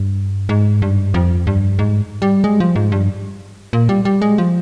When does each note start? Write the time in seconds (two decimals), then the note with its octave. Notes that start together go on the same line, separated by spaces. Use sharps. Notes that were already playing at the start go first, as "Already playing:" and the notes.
Already playing: G2
0.49 G#2
0.82 G2
1.14 F2
1.47 G2
1.79 G#2
2.22 G3
2.44 G#3
2.60 F3
2.76 G#2
2.92 G2
3.73 A#2
3.89 G3
4.05 G3
4.22 G#3
4.38 F3